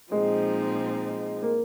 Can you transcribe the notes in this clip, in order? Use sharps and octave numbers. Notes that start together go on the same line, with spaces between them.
A#2 F3 G#3 C4 D#4
A#3